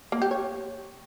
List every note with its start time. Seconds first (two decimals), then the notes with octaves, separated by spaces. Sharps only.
0.12 A#3
0.22 G4
0.31 C#5